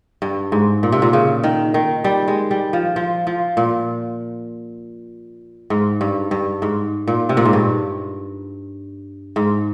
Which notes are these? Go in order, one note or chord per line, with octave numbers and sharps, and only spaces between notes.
G2
G#2
A#2
C3
A#2
C#3
D#3
D#3
G3
G#3
G3
F3
F3
F3
A#2
G#2
G2
G2
G#2
A#2
C3
A#2
G#2
G2
G#2